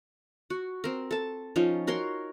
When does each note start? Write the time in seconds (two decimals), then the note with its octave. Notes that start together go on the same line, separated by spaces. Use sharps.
0.50 F#4
0.84 C4 A#4
1.11 A4 A5
1.56 F3 C#4 D#4
1.87 F#4 A#4 C#5 C6